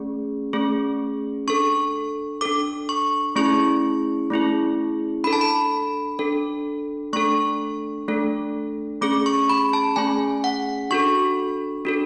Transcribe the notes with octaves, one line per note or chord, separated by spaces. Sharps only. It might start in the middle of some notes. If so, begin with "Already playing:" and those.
Already playing: A3 C#4 G#4
A3 C#4 G#4
D4 A4 C#6
D4 A4 D6
C#6
A3 C#4 E4 G#4 C#6
A3 C#4 E4 G#4
D4 A4 B5
A5
B5
D4 A4
A3 D4 A4 C#6
A3 D4 A4
A3 C#4 G#4 D6
C#6
B5
A5
A3 C#4 G#4 G#5
F#5
D4 F#4 A4 C#6
D4 F#4 A4